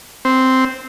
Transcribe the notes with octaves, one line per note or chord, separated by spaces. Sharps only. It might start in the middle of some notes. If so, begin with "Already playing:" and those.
C4